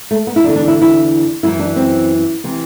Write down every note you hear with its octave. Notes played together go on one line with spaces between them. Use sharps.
A3
B3
E4
E2 D3 D4
D4
E4
E4
F#2 E3 E4
D4
C4
C3 E3